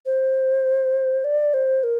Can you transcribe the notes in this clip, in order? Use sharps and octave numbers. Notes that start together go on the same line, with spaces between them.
C5
D5
C5
A#4